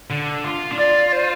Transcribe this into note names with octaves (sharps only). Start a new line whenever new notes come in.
D3
F4
D4
F4 D5
D5
C5